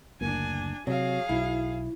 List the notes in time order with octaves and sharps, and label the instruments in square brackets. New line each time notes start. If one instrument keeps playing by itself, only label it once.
[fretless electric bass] F#1 D2 A#3 [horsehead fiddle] D4 G#5
[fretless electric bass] C3 [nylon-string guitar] F#3 [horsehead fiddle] G#4 F5
[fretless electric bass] B1 F#3 [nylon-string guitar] E4